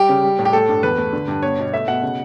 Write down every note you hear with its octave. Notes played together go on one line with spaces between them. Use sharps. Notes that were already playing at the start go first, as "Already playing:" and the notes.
Already playing: G3 G4
C#3
G3
A2
G4
A3 A4
G2
E2 B4
A3
D3
G2
B3 C#5
B2
A3 E5
B2 F#5
C#3